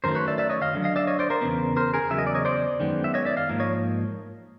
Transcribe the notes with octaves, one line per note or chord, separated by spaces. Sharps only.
F#2 D#3 F#3 A3 A#4 C5
B4 C#5
D5 E5
D5 E5
C#5 D#5
D#5 F5
D#2 D3 F#3
D#5 F5
D5 E5
C#5 D#5
C5 D5
A#4 C5
E2 C#3 F#3 B3
A#4 C5
G#4 A#4
E2 C#3 F#3 E5
D#5
D5
C#5 D#5
C5 D5
F#2 D#3 G#3 B3
E5
C#5 D#5
D5 E5
D#5 F5
G#2 F3 A#3
C#5 D#5